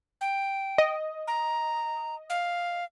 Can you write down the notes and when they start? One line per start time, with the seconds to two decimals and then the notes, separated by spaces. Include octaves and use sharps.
0.21 G5
0.78 D#5
1.27 A#5
2.30 F5